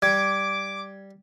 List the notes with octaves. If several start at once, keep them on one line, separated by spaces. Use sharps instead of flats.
G3 D6 G#6